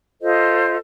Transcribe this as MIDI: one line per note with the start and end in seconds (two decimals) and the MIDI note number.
0.21 0.77 65
0.21 0.77 69
0.21 0.77 72
0.21 0.77 75